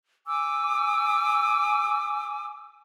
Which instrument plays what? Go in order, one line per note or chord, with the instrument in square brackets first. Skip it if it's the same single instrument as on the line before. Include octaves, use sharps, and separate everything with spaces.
[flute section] G#5 D6 E6